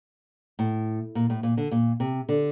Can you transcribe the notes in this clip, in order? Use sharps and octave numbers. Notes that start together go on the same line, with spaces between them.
A2
A#2
A2
A#2
D3
A#2
C3
D3